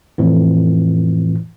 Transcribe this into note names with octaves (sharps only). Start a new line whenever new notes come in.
F2 A2 E3